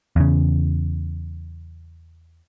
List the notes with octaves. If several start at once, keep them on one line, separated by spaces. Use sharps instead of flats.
E2 C#3